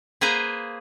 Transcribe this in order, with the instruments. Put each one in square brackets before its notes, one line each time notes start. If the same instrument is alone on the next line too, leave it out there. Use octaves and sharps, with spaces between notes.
[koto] A#3 G#4 B4 C5 A#5